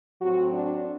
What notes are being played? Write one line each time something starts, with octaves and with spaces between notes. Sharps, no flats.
A2 F#3 C4 F#4
D4